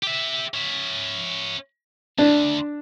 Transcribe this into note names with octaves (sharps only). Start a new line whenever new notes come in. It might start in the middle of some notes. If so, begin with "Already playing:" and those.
G4 E5
C#4 E5
D2 D4